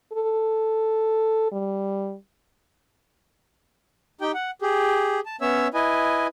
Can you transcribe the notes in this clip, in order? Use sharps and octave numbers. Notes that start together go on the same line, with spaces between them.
A4
G3
D#4 G4 G5
F#5
G4 G#4
A5
B3 C#4 C#5 E5 E6
E4 B4 D#5 G#5